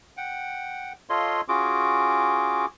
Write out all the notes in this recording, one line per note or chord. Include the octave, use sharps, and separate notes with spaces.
F#5 G5
F4 A4 C#5 D#5 F5 C6
C#4 F4 F#4 G#4 D6